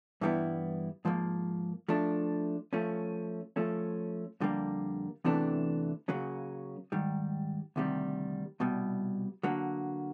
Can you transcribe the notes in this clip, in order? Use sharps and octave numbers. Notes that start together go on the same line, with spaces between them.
G2 E3 G3 B3 E4
G#2 F3 A#3
F3 A3 D4
F3 A3 C#4
F3 A3 C#4
F2 D3 G3 A#3
E2 C3 E3 A3 D4
C#3 F#3 A#3 C#4
G#2 D#3 G3
D2 C3 D#3 G3
C2 B2 G3
D3 F#3 A#3